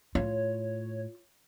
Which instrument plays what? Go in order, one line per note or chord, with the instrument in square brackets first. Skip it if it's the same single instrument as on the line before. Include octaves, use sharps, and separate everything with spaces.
[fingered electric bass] A2 [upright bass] F4 [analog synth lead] C#5